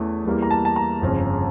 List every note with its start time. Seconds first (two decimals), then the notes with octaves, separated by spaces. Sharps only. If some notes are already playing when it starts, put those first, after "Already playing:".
Already playing: E2 E3 A3 C#4
0.25 E2 E3 G3 A#3
0.42 A#5
0.51 A5
0.65 A5
0.76 A#5
1.01 G1 F2 C#3